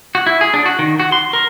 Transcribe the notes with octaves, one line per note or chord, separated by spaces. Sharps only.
F#4
E4
G#4
D4
F#4
D#3
F#4
C6
A#4